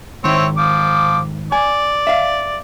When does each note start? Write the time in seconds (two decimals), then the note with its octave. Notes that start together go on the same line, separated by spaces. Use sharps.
0.24 G#2 D#3 C4 E4 C#5
0.57 F3 D6
1.52 D5 G#5
2.07 E5 F5